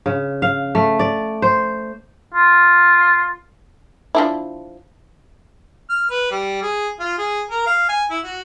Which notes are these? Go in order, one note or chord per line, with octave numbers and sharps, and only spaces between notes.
C#3
F5
A3
D5
C5
F4
F3 D4 E4
F6
B4
G3
G#4
F4
G#4
A#4
F5
G#5
E4
F#4